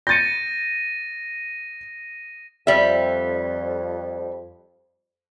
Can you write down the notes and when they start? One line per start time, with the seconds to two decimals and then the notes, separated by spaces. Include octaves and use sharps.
0.07 G6 A6 A#6 C#7 D#7
2.67 F2 G3 E5